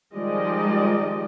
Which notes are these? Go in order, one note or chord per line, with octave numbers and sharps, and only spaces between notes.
D#3 F3 G3 G#3 D5 D#5